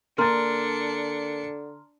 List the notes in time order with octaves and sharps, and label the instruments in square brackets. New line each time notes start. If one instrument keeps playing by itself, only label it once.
[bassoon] D3 [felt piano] A#3 A6 [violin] D4 C#7 [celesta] A#5 C6 F6